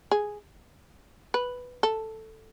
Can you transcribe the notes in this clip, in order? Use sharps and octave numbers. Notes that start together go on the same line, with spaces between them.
G#4
B4
A4